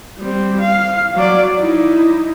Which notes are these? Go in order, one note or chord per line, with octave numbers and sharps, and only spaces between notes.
G3 C4
F5
F#3 D5
D#4 E4